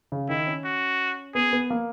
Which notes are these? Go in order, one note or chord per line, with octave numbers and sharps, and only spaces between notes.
C#3
D#3 E4
C#4
F#4
B3 G#4
B3
A#3